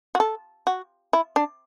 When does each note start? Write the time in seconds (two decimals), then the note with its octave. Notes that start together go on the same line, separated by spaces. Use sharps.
0.15 F#4
0.20 A4
0.67 F#4
1.13 E4
1.36 D4